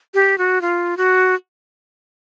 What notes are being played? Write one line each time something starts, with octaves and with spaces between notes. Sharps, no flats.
G4
F#4
F4
F#4